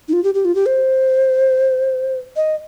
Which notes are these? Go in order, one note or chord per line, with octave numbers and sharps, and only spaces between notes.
D#4
F4
G4
G4
F4
G4
C5
D#5